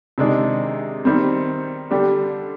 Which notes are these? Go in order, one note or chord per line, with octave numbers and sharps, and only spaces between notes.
C3 D#3 G#3 D4 G#4
D#3 G3 C4
D3 G3 D4 G4